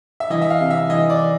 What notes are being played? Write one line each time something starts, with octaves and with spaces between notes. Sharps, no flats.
E5
E3 D#5
E5
F5
C3
E5
E3 D#5
D5